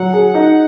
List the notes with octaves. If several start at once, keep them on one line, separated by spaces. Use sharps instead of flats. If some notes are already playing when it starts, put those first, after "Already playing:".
Already playing: F#3 F#5
G#4
D#4